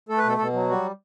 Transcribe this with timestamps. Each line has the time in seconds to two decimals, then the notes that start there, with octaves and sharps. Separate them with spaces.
0.09 A3 A4
0.18 B4
0.24 B2 A4
0.38 B2 A4
0.53 F#3
0.69 G3 F#4